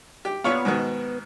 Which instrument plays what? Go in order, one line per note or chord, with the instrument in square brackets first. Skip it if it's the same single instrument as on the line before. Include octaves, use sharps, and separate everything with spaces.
[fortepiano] G4
[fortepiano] A#2 C#5 F5 [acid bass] B3
[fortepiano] G#2 B2 D#3